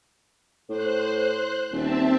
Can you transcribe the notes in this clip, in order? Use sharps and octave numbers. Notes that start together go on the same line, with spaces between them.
A2 C5 F#6
D#1 C4 E5 A5